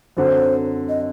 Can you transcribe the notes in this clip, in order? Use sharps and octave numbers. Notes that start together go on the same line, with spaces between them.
F#2 D3 F#3 C4 C5
D#5